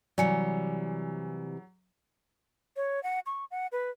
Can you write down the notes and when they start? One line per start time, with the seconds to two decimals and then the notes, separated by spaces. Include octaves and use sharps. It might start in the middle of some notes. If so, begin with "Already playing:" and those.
0.18 C3 E3 F#3 G3 D5 G#5 C#7
2.76 C#5
3.03 F#5
3.26 C#6
3.51 F#5
3.72 B4